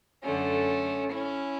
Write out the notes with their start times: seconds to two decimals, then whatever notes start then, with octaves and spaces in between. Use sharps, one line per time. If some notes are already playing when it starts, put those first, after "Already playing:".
0.23 F#2 D3 A3 C#4
1.13 C#4 E4